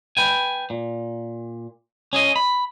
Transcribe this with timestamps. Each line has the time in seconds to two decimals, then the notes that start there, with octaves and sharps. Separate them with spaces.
0.17 B4 G5 G#5
0.70 A#2
2.13 C#4 G#4 D#5
2.36 B5